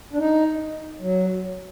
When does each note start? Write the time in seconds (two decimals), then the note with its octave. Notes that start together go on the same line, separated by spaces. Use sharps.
0.13 D4
0.19 D#4
1.01 F#3